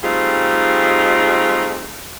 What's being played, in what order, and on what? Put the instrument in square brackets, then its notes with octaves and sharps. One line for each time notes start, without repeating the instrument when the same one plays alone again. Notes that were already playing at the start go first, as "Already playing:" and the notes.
[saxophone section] G3 A3 C4 D#4 F4 G#4